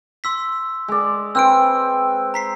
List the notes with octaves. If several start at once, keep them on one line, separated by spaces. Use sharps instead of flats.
C6 E6 B6
G#3 D5
C4 B4 E6 F6 D7
A#5 B6 C7